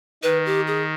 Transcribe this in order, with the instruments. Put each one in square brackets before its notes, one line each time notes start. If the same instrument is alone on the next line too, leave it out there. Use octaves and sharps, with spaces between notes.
[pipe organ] D#3 [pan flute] B4
[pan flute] G4
G#4